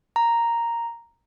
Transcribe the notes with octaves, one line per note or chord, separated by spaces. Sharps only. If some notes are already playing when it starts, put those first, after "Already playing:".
A#5